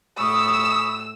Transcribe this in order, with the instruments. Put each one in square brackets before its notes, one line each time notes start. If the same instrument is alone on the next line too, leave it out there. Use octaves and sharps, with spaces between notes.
[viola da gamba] A2 [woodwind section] B5 C#6 D#6 [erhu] E6